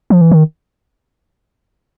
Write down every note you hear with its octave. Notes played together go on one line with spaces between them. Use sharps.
F3
E3
D#3